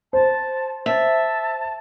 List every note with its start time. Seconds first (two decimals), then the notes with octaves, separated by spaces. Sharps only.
0.13 C5 A5
0.86 E5 A5